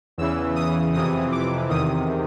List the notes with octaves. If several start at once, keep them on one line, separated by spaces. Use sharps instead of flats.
E2 C#3 E3 E6
D#6
F2 C3 E3 D#6
D6
E2 C3 D#3 D#6